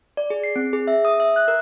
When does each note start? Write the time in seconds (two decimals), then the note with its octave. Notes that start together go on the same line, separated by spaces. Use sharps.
0.17 D5
0.30 G#4
0.44 C7
0.56 C4
0.73 G#4
0.87 E5
1.05 D#6
1.20 E5
1.36 F#6
1.48 A#4